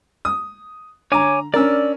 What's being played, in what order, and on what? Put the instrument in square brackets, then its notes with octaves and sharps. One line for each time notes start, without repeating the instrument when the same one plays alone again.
[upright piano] D#6
[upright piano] D3 A#5 [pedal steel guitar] C#5 G#5 D6
[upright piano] C#4 D4 A#4 [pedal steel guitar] D5 E6